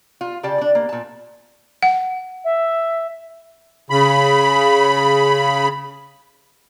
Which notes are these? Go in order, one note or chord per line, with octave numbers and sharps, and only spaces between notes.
F4
C#3 G4 D5 G5 A5
D4 D5
A#3
A#2 A5
F#5
E5
C#3 B5